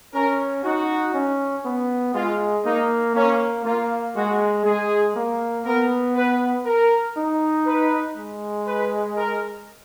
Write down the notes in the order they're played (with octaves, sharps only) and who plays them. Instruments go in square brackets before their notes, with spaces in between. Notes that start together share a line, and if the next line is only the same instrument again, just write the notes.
[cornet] C#4 [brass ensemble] A#4
[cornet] D#4 [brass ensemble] F#4
[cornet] C#4
B3
[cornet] G#3 [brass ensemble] F4
[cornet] A#3 [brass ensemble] D#4
[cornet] A#3 [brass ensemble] C#4
[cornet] A#3 [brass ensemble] F4
[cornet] G#3 [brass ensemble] F#4
[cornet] G#3 [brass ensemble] G#4
[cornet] A#3
[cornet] B3 [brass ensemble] A#4
[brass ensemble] B4
A#4
[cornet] D#4
[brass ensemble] B4
[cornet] G#3
[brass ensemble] B4
A#4